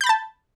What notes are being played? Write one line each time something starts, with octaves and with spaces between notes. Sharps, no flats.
A5 B5 G6 A6